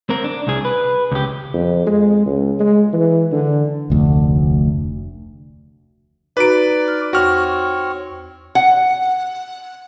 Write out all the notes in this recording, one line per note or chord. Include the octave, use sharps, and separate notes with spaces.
C4 A#4
D4
C2 G#4
B4
C#2 G4
F2
G#3
C#2
G#3
E3
D3
F1 D2
D#4 F#4 B4 D5 A#5 D7
F6
E2 C4 F#4 C#5 F6
F#5